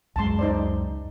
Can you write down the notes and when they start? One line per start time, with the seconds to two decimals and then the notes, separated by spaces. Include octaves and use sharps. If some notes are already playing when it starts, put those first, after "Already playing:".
0.16 C#2 F#2 G#3 A5 C6
0.39 D#4 C5 D5